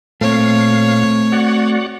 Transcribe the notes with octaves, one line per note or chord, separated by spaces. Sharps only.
A#2 A3 C4 C#5 F5
F#4 D5 F#5